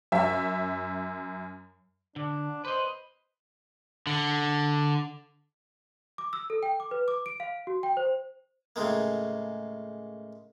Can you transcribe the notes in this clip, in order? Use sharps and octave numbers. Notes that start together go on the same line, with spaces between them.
F#2 E5
D3 D4
B4 C5 D#5
D3
D6
E6
A4
G5
D6
B4
D6
D7
F5
F#4
G5
C5
A2 C#3 G#3 A#3